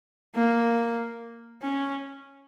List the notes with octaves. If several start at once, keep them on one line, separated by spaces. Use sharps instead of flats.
A#3
C#4